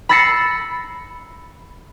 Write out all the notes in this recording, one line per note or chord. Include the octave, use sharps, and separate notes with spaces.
B5 E6 A6 A#6 C7 C#7